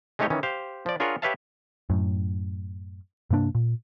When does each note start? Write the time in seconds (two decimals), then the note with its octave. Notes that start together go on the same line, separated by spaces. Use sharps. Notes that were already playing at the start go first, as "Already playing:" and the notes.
0.19 G#3 A3 D#4 G4 C#5 D#5
0.30 D#3 E3 C#4
0.43 G4 C5 F5
0.86 F3 D5
1.00 D4 F4 G#4 A#4 C#5 F#5
1.22 G4 B4 C#5 E5 F5 A5
1.90 F#2 A2
3.30 G2 C3 A#3 D4
3.55 A#2